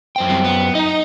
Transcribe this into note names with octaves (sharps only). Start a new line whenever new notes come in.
F#2 C5 G5
G3 C4
B3
D#4 D#5 A#5